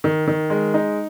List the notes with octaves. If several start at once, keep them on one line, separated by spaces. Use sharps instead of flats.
D#3
D#3
G#3
D#4